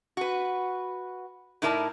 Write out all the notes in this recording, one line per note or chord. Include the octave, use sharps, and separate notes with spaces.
F#4 B4
A2 D#4 E4 A#4 D5 A5